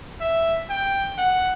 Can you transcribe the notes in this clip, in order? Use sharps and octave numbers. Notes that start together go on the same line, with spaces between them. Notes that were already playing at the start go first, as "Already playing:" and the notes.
E5
G5
F#5